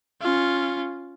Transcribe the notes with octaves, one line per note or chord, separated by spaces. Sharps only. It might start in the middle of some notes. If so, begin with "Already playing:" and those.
C#4 F4